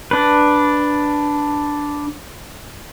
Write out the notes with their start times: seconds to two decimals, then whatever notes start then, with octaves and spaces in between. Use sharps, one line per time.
0.11 D4 B4